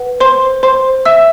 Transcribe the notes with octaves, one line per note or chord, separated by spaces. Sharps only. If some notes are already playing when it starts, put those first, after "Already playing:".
Already playing: B4 F#5
C5 C6
C5 C6
E5 E6